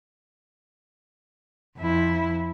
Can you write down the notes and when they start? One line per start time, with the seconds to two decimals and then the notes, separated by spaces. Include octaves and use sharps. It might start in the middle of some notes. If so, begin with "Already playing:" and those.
1.78 F2 E4